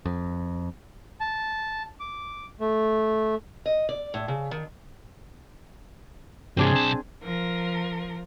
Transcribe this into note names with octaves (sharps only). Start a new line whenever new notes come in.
F2
A5
D6
A3
D#5
D5
A2
C#3
D#3
G2 C3 C4 D4 G#4
B1 A5
F3 A#4